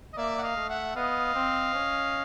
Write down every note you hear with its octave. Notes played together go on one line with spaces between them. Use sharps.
D#5
A#3 D5 E5
F#5
D#5 F5
A3
E5 F#5
B3 D#5 F5
C4
C#4